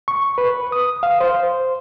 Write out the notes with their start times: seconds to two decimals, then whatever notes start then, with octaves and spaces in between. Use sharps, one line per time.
0.08 C#6
0.38 B4
0.72 D#6
1.03 F5
1.21 C5